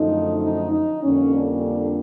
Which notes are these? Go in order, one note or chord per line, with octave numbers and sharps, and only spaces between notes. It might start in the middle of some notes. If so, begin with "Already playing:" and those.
Already playing: F#2 D3 F3 A3 D#4
D#4
D#4
F2 D3 G3 A#3 C#4
D4